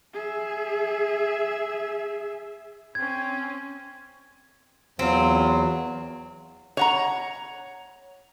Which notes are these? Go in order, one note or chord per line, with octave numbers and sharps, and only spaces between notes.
G#4 E5
C4 C#4 G#6
E2 F#3 C4 F4
C#5 F#5 A#5